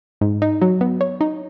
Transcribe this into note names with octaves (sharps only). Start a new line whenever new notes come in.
G#2
D#4
F#3
B3
C#5
D#4